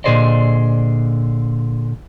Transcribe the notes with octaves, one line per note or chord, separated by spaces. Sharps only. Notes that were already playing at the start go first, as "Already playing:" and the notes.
A#2 D3 G#4 C5 D5 D#5